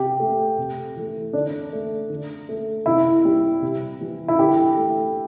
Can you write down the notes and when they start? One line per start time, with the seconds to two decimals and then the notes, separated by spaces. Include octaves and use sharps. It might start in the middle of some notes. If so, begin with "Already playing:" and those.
Already playing: C3 G4
0.20 A3
0.58 C3
0.96 E3 A3
1.33 D3 D4
1.73 A3
2.10 D3
2.49 A3
2.86 C3 E4
3.25 G3
3.62 C3
4.01 E3 G3
4.28 E4
4.38 D3 G4
4.77 A3